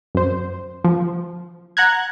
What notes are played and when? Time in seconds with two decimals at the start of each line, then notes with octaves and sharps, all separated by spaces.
0.15 F#2 C5
0.84 F3
1.77 F#5 A#5 F#6 G#6